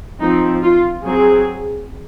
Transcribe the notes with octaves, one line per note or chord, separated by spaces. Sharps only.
F3 C4 D#4
F4
F#3 C4 G#4